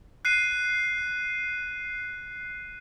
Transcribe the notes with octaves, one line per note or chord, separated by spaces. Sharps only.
F#6 C7 D#7